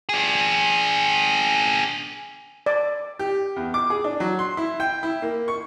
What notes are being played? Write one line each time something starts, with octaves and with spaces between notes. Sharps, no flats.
D4 G#4
D5
G4
E2
D6
G#4
D4
F#3
C6
E4
G5
E4
A#3
C#6